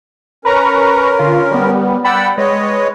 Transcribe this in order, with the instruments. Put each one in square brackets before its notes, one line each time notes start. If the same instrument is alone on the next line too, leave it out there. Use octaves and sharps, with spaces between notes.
[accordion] C#4 A#4 [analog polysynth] B4 A#5 C#6
[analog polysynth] D3 F4
G3 B3
[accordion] D5 E6 [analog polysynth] F#5 G5 B5
[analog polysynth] G#3 [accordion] B4 C#5 D#5